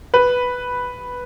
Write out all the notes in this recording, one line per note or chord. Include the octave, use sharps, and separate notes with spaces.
B4